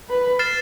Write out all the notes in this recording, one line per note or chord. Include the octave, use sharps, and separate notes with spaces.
B4
F6 A6 C7 E7